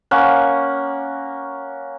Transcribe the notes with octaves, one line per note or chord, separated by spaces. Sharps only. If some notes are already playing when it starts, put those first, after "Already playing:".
A#3 C#4 F#5